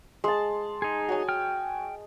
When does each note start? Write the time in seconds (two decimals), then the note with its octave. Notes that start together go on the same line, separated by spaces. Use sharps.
0.24 G#3 A5 C6
0.82 D#4 G#4
1.09 F#4 C#5 G#5
1.29 G5 F6